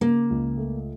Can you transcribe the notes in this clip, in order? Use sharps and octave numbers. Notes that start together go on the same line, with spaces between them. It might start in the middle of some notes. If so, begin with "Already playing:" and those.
C#3 A#3
C#2
A3